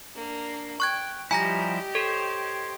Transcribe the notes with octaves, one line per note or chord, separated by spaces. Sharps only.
A#3 D4
G5 C#6 F#6 G#6
F3 G3 E4 G4 D#5 G#5 A#5 A#6
A4 C5 C#5